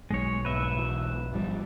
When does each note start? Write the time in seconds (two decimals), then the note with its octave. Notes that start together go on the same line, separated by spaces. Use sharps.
0.11 B1 G#3 C#5
0.45 G#2 B2 B4 E5
0.76 B2 E3 F#3
1.32 G#1 F3 G3